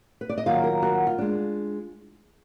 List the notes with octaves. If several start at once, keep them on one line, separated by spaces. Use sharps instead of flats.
B4
D5
D#5
D#3 F#3 A#3 F4 F5
A#4
F#4
F4
G#3 D4